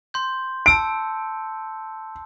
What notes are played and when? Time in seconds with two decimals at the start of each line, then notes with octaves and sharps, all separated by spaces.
0.14 C6 G6
0.66 A5 E6 C#7 D7